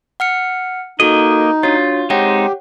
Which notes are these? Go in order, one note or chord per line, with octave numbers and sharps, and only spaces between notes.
F#5 F6 C#7
A#3 D#4 F#4 A4 D#5
D4 F4 F#4 C#5
G#3 C4 D#4 G4 C#5 F#5 G5